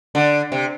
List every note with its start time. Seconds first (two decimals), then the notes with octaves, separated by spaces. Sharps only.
0.15 D3
0.52 C3